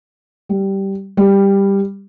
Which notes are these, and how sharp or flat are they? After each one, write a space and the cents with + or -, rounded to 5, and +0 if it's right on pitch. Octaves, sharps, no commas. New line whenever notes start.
G3 -10
G3 +10